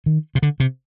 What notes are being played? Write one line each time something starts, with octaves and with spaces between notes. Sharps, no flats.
D#3
C3
D3
C3